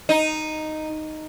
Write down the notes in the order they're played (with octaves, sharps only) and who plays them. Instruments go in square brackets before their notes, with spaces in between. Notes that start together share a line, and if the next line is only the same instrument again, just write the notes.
[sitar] D#4